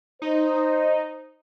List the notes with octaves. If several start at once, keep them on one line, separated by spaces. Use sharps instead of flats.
D#4 C5